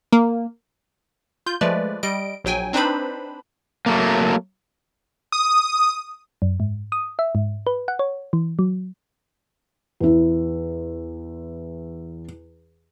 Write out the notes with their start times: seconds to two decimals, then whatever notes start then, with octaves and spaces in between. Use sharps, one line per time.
0.12 A#3
1.46 F4 G6
1.61 F3 G#3 A3 B4 D5
2.03 G3 D#5 D7
2.45 A#1 F#3 G5 G#5
2.73 C4 D4 D#4 B4 C5 B5
3.86 F#3 A3 A#3
5.32 D#6
6.42 F#2
6.60 G#2
6.92 D#6
7.19 E5
7.35 G#2
7.67 B4
7.88 F#5
7.99 C#5
8.33 E3
8.59 F#3
10.00 E2 E4